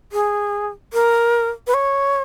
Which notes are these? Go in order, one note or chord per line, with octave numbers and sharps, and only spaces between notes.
G#4
A#4
B4
C#5